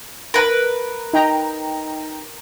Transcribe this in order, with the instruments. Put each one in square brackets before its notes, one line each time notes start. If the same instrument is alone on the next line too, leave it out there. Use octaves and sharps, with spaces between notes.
[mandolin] A#4 B4
[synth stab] D#4 G5 A#5